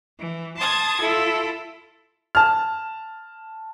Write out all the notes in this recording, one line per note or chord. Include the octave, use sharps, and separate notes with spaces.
E3
A5 C6 D#6 G#6 A6
E4 F4 A4
A5 F6